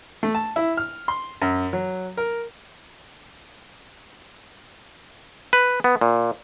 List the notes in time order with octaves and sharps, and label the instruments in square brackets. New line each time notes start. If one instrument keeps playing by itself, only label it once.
[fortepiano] A3
A5
E4
F6
C6
F#2
F#3
A#4
[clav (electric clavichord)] B4
B3
A#2